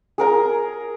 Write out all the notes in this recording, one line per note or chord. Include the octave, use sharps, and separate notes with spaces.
G#4 A#4 A#5